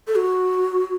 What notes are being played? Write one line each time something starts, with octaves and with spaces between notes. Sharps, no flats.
A4
F#4